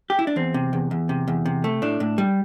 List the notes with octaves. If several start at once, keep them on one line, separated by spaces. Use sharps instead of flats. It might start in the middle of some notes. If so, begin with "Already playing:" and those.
G4
E4
D4
E2 C4
C3
E2
E2
C3
E2
C3
A3
A2 D4
A2
G3